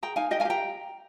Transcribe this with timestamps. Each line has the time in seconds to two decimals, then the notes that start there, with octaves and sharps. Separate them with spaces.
0.03 G#4 G5 A#5
0.16 D#4 F5 G#5
0.31 G4 D#5 G5
0.40 F5 G#5
0.45 G4 G5 A#5